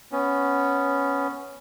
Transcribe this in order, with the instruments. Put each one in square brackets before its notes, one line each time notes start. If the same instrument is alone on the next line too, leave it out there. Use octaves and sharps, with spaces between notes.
[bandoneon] B3 C#4